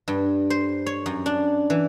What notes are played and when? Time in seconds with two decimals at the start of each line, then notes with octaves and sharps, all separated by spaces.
0.08 G2
0.50 C5
0.86 C#5
1.06 F#2
1.26 D4
1.70 E3